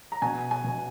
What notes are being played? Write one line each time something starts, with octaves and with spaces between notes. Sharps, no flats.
A#5
B2 G#5
G#5
B2